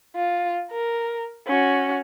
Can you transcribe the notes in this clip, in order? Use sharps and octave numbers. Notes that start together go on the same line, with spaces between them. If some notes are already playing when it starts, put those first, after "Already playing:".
F4
A#4
C#4 F#4